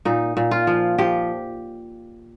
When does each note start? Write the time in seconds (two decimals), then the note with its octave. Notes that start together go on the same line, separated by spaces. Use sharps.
0.05 A#2 D#4
0.37 A#2
0.51 F4
0.67 F3
0.98 F3 G4